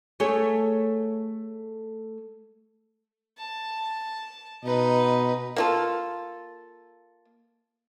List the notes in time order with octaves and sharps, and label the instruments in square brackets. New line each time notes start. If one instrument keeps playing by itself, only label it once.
[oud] A3 G#4 C#5
[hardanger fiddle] A5
[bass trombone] B2 [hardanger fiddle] D#4 B4
[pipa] A#3 F4 A4